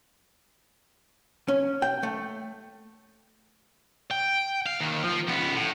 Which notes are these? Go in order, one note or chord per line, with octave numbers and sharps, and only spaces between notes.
C#4
G5
A3
G5
F5
D#2 D#3
F3
C#2 B3
A2